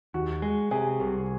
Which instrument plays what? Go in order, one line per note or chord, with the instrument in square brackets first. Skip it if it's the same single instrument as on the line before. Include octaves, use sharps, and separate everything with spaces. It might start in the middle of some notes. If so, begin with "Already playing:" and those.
[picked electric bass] D#2 [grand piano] F#4
[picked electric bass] G#3
[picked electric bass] C3 [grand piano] G#4
[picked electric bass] C2